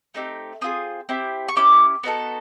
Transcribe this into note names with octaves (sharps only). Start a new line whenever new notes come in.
A3 C4 D#4 G4
C4 F4 G#4 D#6
C4 E4 G4
C#6
C#4 E4 G4 D6
B3 D#4 F#4 A4